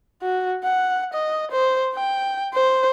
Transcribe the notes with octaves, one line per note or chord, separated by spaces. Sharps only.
F#4
F#5
D#5
C5
G5
C5